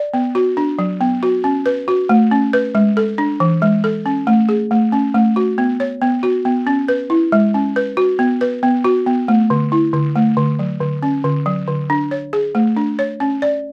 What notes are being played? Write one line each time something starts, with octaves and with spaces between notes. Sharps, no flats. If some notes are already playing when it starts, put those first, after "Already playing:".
Already playing: D5
B3
F#4
D4
F#3
B3
F#4
C#4
B4
F#4
A3
C#4
B4
G#3
A4
D4
E3
G#3
A4
C#4
A3
G#4
A3
C#4
A3
F#4
B3
C#5
B3
F#4
B3
C#4
B4
E4
G#3
C#4
B4
F#4
B3
B4
B3
F#4
B3
A3
D3
E4
D3
A3
D3
F#3
D3
C#4
D3
F#3
D3
D4
C#5
G#4
A3
D4
C#5
C#4
D5